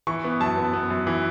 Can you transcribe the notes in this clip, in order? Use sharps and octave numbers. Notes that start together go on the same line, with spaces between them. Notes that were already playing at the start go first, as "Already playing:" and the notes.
E3 C#6
B3
F#2 A5
B3
B3
F#2
E3